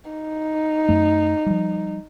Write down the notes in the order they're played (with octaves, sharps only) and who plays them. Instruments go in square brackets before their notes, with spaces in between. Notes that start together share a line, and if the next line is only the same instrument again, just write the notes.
[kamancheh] D#4
[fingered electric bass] F#2 A3
F3 G3